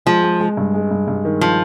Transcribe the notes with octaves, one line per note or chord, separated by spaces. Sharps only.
F3 G#3
G#3
G#3
G2
G#3
G2
G2
D#3
F3